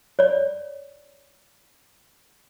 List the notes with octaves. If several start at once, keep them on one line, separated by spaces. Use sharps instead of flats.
C#5 D5